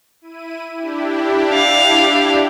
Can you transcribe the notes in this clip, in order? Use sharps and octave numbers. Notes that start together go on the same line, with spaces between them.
E4 D#7
D4 E4 G4
F5